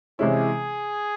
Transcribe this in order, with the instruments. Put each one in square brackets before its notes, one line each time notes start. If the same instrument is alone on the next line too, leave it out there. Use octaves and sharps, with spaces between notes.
[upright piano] C3 E3 G#3 C#4 E4 [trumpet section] G#4